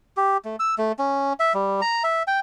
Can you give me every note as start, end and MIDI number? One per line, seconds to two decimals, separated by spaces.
0.17 0.37 67
0.45 0.56 57
0.59 0.75 88
0.78 0.92 57
0.99 1.33 61
1.40 1.53 76
1.54 1.81 55
1.81 2.03 82
2.04 2.23 76
2.27 2.40 79